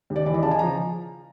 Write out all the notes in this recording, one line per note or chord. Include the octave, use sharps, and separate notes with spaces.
D#2
D5
E3 D5
D#5
C#3 A5
G#5
F3 A#5